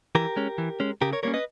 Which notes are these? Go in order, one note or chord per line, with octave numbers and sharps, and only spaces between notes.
E3 G4 A#4
G#3 C#4
E3
G#3 C#4
C#3 G4 A#4
A#4 C#5
G3 A#3 C#4 A#4 C#5
B4 D#5